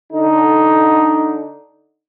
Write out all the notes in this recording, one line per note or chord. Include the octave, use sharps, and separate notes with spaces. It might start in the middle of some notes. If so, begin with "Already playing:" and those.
D3 D#4